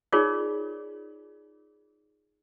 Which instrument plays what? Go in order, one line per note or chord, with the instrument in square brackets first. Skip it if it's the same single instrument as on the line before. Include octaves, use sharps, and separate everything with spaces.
[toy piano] D#4 F4 G#4 A#4 C#5 D5